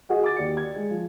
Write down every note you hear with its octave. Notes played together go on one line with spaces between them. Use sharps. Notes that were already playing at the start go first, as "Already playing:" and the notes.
F#4 G#4 D#5 F#5
D6 A6
D#2 G4 D5 C#7
G#6
G#3
F3